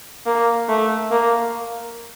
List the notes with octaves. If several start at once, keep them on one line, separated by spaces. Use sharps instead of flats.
A#3
A3
A#3